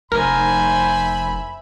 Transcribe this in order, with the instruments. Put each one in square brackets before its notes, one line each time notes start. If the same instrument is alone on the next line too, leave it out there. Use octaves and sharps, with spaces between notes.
[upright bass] F1 [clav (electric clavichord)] A#4 [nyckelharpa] C5 G#5 [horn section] E5 B5